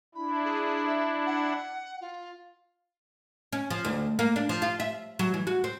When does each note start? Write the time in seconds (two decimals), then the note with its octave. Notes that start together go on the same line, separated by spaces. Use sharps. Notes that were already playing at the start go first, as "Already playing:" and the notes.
0.15 D4 E4 B5
0.45 G#4
0.86 E5
1.26 F#5
2.01 F4
3.53 C#4
3.70 F3
3.85 D2
4.19 A#3
4.36 D4
4.49 F3
4.62 F4
4.80 E5
5.19 F#3
5.34 E3
5.47 F#4
5.64 C4